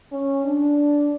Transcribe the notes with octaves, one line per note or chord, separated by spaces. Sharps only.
C#4
D4